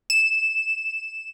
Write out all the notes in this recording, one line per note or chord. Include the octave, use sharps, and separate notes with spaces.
E7